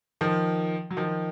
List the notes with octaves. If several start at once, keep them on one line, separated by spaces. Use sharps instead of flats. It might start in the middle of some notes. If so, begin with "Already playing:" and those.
D#3 F3
F#3
D#3 F3